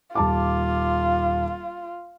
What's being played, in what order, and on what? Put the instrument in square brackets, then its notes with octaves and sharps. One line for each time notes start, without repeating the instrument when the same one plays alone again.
[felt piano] D#1 A5 D6 [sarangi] F4